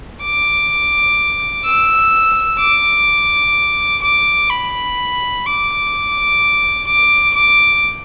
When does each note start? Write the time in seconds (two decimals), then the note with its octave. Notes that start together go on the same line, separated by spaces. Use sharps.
0.22 D6
1.65 E6
2.60 D6
4.03 D6
4.50 B5
5.46 D6
6.88 D6
7.35 D6